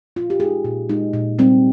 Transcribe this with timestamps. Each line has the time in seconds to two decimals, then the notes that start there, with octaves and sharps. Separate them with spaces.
0.16 A#2 F4
0.30 G4
0.40 G#3 D#4 G#4
0.65 A#2
0.89 G#3 D#4
1.13 A#2
1.39 G3 C4